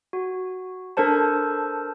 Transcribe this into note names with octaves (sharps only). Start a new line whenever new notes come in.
F#4
D4 A4 A#4 C5 A5